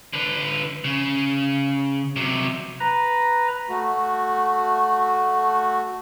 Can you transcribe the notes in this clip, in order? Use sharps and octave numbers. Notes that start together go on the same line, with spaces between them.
D3 B4
C#3
C3 F#3
B4 A#5
A3 F#4